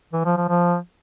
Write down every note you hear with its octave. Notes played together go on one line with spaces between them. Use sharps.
E3
F3
F3
F3